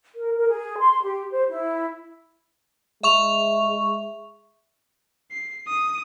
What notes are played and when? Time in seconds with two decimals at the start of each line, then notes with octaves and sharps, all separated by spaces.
0.16 A#4
0.36 A#4
0.48 G#4
0.79 C6
1.02 G4
1.31 C5
1.49 E4
3.03 G#3 E5 C#6 F7
5.31 C7
5.68 D#6